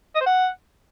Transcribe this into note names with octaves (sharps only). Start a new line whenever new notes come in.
D#5
C5
F#5